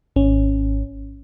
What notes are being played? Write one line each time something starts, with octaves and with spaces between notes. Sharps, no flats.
G#1 C#4